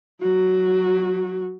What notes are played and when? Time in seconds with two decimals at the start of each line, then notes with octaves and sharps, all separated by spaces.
0.22 F#3 F#4